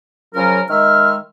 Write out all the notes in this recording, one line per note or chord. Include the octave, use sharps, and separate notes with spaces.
C#3 F3 F#3 C#4 F4 A#4
D#3 G#3 E5 F6